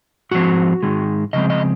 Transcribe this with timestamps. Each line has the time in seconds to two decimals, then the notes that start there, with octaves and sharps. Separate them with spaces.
0.31 G#2 F3 C4 F#4
0.83 G#2 D#3 G#3
1.33 C#3 F3 G#3 C4 D#5
1.50 D#5